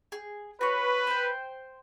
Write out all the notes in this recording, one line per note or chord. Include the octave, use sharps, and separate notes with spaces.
G#4
F#4 B4 C#5
C5 G5